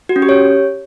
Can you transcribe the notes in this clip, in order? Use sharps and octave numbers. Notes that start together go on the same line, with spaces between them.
F#4
C#4
G4
C#5